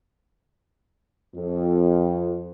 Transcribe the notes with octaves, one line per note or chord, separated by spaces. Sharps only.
F2